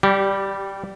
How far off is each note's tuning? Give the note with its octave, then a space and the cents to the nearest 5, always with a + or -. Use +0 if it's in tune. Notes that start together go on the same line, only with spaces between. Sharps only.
G3 +0 G4 -25